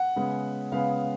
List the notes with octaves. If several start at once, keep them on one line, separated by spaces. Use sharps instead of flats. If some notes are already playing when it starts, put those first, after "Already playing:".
Already playing: F#5
C#3 G#3 B3
C#3 G#3 B3 F5